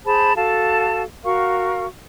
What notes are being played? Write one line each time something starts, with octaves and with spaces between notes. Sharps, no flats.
G#4 C5 A5 B5
F#4 A4 F5 A5
F#4 A#4 F5 C#6